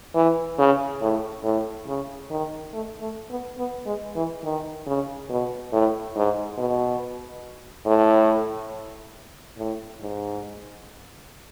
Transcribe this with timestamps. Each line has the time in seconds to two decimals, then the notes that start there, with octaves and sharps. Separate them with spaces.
0.15 E3
0.59 C#3
1.01 A2
1.44 A2
1.87 C#3
2.30 D#3
2.73 A3
3.01 A3
3.30 B3
3.58 B3
3.86 G#3
4.15 E3
4.44 D#3
4.87 C#3
5.29 B2
5.72 A2
6.16 G#2
6.58 B2
7.86 A2
9.58 A2
10.02 G#2